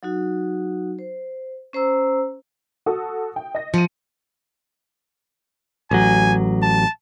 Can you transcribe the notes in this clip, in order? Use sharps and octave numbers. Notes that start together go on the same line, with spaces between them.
F#3 D#4 F#4
C5
C#4 C5 A#5 E6
F#4 A4 D#6
G5
D#5 A#6
F3 C#7 D#7
A1 F#3 G#5
A5